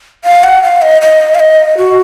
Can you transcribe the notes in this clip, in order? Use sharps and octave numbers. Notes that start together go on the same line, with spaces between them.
F5
F#5
F5
D#5
D#5
F5
D#5
F#4